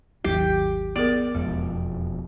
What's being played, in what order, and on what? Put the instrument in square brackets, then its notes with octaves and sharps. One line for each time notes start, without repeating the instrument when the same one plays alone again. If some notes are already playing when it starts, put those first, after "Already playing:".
[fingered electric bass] G#1 D#2 F#3 [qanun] G4
[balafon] B3 G#4 A#4 [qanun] D5
[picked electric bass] E1 F2 [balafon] G#3